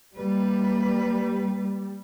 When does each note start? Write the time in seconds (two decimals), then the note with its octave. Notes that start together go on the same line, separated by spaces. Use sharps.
0.17 G3 A#3 B4